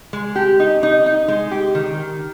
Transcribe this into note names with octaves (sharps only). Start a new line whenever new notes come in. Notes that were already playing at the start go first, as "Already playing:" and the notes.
G#3
G4
D#4
D#4
D#4
G#3
G4
D#3